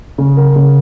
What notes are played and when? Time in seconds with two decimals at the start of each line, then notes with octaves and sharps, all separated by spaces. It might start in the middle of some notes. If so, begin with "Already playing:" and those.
0.18 C#3
0.37 A#4
0.56 C#3